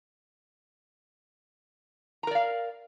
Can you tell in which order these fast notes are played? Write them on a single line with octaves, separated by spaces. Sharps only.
A#5 A#4 D5 F5